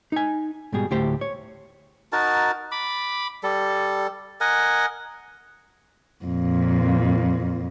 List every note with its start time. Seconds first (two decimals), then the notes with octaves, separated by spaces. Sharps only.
0.12 D#4 G#5
0.73 G#2 B2 G3 G#4
0.91 D2 A2 G4 C5
1.21 C#5
2.13 D#4 F#4 A#4 A5
2.72 B5 D6
3.43 G3 A4
4.41 A#4 D#5 F#5 G#5
6.24 F2 A#2